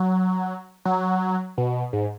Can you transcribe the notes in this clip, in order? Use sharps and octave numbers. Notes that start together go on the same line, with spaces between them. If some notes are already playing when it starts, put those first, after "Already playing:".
Already playing: F#3
F#3
B2
G#2